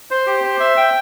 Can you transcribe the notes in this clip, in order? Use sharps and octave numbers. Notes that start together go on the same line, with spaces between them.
C5
G4
C5
E5
G5